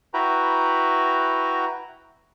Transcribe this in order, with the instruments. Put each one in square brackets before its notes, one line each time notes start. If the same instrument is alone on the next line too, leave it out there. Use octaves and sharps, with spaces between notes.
[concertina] E4 F#4 B4 G5 A#5